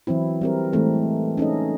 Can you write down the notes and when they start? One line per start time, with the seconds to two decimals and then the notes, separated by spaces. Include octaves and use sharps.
0.07 E3 F#3 C4 E4
0.41 G3 C4 A#4
0.73 E3 G#3 A3 C4
1.38 C#4 D#4 A4 D#5